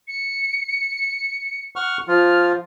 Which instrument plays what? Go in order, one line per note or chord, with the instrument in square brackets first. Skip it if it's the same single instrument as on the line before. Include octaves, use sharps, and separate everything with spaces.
[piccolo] C#7
[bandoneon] F#5 C#6 F6
[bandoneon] F3 F4 [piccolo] F6